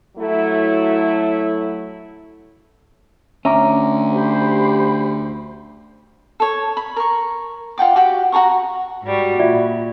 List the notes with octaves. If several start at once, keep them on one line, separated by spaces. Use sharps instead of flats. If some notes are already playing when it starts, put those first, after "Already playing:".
F#3 A3 E4
D2 C#4 E5 A#5 D6
G4 C5 B5
A4 C#5
B5
A#4 C#6
F4 F#5 G5 D6
F#4 G4 G5
F#4 A4 A#5 C#6
G#2 G3 F#4
A#2 F4 D5 E5